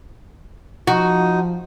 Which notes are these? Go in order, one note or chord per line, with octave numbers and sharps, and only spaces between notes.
F3 D#4 F#4